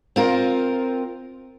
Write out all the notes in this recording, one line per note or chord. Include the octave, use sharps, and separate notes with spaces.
C4 F4 A#4